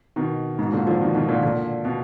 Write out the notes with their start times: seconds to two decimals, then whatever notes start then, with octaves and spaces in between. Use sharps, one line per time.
0.16 B2 D#3
0.59 G#2 B2
0.72 A#2 D3
0.87 D3 F3
1.01 B2 D#3
1.15 B2 D#3
1.28 A#2 D3
1.43 A#2 D3
1.85 B2